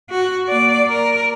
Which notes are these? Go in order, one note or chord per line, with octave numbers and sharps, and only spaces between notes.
F#4
A#3 D5
A#4